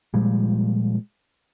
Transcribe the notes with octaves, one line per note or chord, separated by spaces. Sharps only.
A#2 F3 G3 G#3